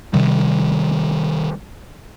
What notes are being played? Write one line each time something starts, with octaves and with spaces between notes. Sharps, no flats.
C3 D#3 G3